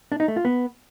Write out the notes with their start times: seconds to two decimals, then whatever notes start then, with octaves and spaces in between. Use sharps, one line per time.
0.12 D4
0.20 D#4
0.28 A3
0.36 F4
0.45 B3